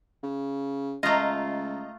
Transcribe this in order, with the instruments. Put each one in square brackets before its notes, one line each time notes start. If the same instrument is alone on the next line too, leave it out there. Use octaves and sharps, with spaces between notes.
[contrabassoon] C#3
[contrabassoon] C#2 [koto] A3 F4 [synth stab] D#5 A#5